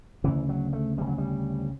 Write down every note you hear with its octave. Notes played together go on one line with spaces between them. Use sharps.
D2 C#3 E3
F#3
A3
D2 C#3 G3
F#3
G3